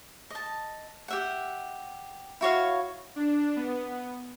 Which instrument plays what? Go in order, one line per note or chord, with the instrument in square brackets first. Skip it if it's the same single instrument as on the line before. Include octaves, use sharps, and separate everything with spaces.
[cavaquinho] D#5 A5
G4 E5 F#5
E4 F#4 C#5 F5
[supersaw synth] D4
B3